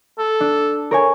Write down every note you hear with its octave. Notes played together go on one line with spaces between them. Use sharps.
A4
D4
A#4 C#5 G#5